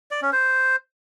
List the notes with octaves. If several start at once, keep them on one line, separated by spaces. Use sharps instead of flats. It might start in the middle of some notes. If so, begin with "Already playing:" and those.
D5
C#4
C5